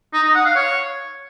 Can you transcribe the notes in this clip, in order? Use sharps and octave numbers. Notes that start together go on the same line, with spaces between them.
D#4
D#4
F#5
F5
C#5